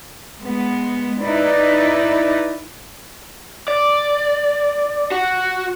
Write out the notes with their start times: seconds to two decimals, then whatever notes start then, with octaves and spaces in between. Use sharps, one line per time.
0.41 G#3 B3
1.21 D#4 E4 B4 D5
3.68 D5
5.11 F#4